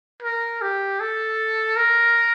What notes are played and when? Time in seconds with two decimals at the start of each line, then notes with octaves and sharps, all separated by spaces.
0.22 A#4
0.62 G4
1.00 A4
1.76 A#4